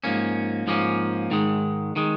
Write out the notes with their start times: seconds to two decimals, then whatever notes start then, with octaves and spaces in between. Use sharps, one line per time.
0.04 G#2 F3 A#3 C#4
0.67 G#2 F3 A#3 C#4
1.31 G#2 D#3 G#3
1.96 D#3 G#3